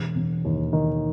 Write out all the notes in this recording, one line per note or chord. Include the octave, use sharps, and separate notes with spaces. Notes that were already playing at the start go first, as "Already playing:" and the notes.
Already playing: E1
E1
D#2
D#3